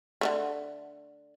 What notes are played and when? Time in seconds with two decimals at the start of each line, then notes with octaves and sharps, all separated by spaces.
0.21 D3 E3 A3